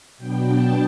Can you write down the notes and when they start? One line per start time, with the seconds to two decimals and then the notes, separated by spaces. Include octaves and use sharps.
0.18 B2 F#3 B3 D4 G5
0.48 A5